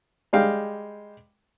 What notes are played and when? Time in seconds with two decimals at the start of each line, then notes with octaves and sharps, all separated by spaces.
0.33 G3 G#3 F5 G5